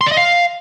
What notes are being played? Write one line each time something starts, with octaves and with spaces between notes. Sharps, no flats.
C6
D5
D#5
F5